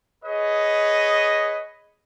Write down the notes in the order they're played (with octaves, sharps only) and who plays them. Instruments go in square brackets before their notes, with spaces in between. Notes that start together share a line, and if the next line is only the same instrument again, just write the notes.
[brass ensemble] G#4 B4 C#5 D#5